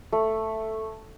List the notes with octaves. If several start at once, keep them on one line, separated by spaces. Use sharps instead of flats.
A3